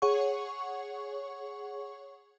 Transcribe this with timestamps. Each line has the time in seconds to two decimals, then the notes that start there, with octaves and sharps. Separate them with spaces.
0.02 G#4 C#5 F#5 C#6